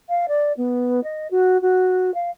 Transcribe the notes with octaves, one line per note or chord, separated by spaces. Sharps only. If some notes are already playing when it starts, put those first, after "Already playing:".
F5
D5
B3
D#5
F#4
F#4
F5